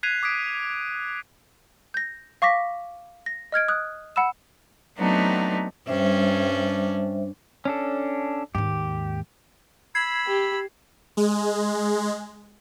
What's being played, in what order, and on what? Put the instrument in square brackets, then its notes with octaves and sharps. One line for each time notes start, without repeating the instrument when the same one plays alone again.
[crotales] F#6 G#6 B6 C7 D#7 F7
D6 D#6 G#6 B6 D7
[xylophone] G6 A#6
F5 C#6 D6 A#6 B6
A#6
D#5 F6 G#6 D7
D#6 F#6
F#5 B5 E6 E7
[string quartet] F#3 A3 B3 C4 D4 D#4
[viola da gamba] G2 C#4 D4 [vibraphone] G3 C5 E5
[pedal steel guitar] C#4 D4 A4
[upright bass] D#2 G#2 [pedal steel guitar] G4
[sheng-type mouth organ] B5 E6 [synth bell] G#6 C7
[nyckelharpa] G4
[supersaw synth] G#3